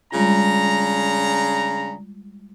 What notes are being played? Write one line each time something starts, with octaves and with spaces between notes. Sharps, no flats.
C#3 G3 G#3 D4 F4 A#5